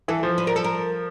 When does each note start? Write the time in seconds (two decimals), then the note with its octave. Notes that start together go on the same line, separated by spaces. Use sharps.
0.08 E3 A4
0.23 F3
0.38 B4
0.47 A#4
0.56 A4
0.64 A#4